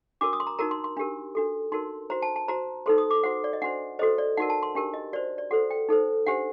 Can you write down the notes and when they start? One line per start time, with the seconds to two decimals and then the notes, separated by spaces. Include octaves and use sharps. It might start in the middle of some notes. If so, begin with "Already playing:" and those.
0.21 D4 F#4 A#4 D6
0.33 D#6
0.40 C6
0.47 A#5
0.59 D#4 F#4 A#4 A#5
0.71 C6
0.84 C6
0.97 D4 G4 A#4
1.35 D4 F#4 A4
1.72 D#4 F#4 A#4 C6
2.10 F#4 C5 A#5
2.22 A5
2.36 A5
2.48 F#4 C5 A#5
2.86 D#4 A4 C5 C6
2.98 D#6
3.11 D6
3.23 F#4 C5 F#5
3.44 D5
3.53 D#5
3.62 D4 F#4 C5 F#5
3.99 F#4 A4 C5 D#5
4.18 D5
4.37 D#4 F#4 A#4 F#5
4.50 A5
4.63 C6
4.75 D4 G4 A#4
4.94 D#5
5.13 F#4 C5 D5
5.38 D5
5.51 F#4 A4 C5 F#5
5.70 G5
5.89 D#4 A4 C5
6.26 D4 G4 C5 F#5